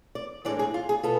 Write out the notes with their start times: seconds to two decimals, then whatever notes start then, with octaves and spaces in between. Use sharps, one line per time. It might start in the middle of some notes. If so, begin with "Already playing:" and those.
0.15 D5
0.45 A2 E3 G#3 D4 D5
0.59 G#4
0.74 F4
0.89 G#4
1.03 B2 B3 F4 A4